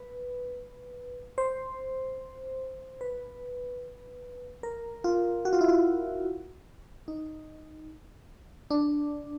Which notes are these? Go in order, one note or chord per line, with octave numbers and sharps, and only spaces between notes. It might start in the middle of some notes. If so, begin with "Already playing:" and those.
Already playing: B4
C5
B4
A#4
F4
F#4
F4
E4
F4
D#4
D4